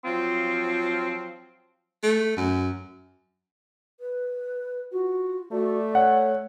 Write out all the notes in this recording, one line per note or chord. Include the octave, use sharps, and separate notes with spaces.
F3 F#3 C4 F4
A3
F#2
B4
F4 F#4
A3 F#4 D5
C#5 F#5